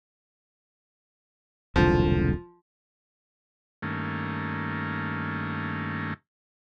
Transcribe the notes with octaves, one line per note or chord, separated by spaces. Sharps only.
E1 C2 D3 F3
G2 D#3 A3 A#3 C#4